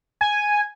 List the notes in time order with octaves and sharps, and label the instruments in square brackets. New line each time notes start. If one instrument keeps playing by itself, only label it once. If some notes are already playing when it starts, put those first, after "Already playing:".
[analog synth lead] G#5